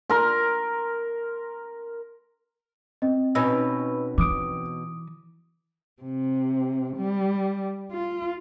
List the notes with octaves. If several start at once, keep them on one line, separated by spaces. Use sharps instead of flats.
A#4 C6
C4 D#5
B2 C#4 D#4 B4 B5 E6
E3 D6 D#6 D7
C3
G3
F4